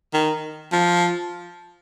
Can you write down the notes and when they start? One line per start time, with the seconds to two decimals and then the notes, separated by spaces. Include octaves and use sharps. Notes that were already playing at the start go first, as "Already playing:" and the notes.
0.13 D#3
0.72 F3